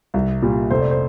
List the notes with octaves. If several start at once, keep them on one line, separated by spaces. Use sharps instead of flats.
C2
A#2 G3
F1 C5
D5
C5